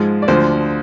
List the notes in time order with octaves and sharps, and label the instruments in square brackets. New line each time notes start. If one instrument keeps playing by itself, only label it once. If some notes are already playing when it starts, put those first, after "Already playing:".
Already playing: [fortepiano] G#2 F3 G#3
D5
D2 D3 F3 C5